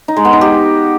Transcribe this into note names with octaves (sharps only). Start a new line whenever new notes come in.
D#4
G#3
B3
D#4
G4